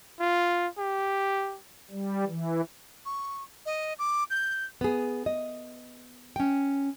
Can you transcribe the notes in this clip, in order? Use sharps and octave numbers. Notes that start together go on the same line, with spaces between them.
F4
G4
G3
E3
C#6
D#5
D6
G6
B3 G#4
D#5
C#4 G5